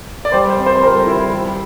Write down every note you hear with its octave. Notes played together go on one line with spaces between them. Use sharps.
D5
G3 C5
C5
C4
C5
C5
G3 A#4
A4
G3 E4
G3